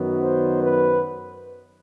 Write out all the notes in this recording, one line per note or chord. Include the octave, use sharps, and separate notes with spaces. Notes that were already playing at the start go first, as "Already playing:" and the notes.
Already playing: F#2 D#3 F#3 B3
C5
B4